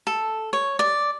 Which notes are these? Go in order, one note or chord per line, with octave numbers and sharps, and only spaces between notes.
A4
C#5
D5